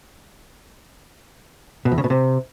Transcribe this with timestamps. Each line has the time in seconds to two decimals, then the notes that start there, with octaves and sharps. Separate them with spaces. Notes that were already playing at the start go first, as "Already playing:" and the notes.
1.85 B2
1.92 E2
1.98 C#3
2.04 B2
2.10 C3